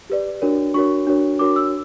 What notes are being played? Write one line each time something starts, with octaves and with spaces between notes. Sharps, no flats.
G4 B4 D5
D4 F#4 A#4 C#5
D4 F#4 A#4 C#5 C#6
D4 F#4 A#4 C#5
D4 F#4 A#4 C#5 D6
E6